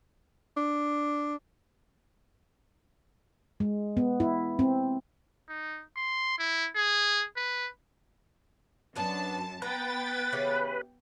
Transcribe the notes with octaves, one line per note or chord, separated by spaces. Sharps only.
D4
G#3
B3
E4
C4
D#4
C6
E4
G#4
B4
F#2 B3 D4 A5
B3 B4 G5 A#5 A6
C#3 E3 G4